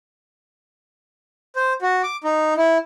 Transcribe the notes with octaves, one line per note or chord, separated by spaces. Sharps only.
C5
F#4
D6
D#4
E4